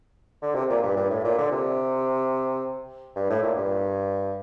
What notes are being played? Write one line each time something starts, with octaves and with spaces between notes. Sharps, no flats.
D3
C3
A#2
G2
G2
A2
A#2
D3
C3
G2
A2
A#2
G2